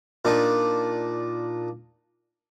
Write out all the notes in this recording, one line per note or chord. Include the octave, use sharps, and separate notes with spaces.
A#2 D4 D#4